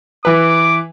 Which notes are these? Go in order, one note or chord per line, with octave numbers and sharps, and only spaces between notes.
E3 B4 D6